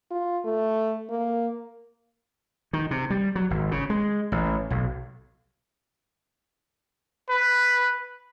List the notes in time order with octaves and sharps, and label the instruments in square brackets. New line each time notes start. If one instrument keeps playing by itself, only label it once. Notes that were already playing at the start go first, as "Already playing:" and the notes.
[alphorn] F4
A3
A#3
[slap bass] D#3
C3
G3
F#3
G#1
C#3
G#3
A1
B1
[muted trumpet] B4